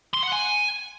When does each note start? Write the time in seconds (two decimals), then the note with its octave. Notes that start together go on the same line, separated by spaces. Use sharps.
0.14 C6
0.23 F#5
0.33 G#5